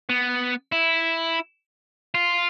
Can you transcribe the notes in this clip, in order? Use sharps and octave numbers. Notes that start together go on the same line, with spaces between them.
B3
E4
F4